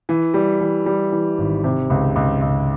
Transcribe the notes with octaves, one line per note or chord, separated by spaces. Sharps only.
E3
G3
E3
G3
E3
G#1
C3
C#2
C#2
C#2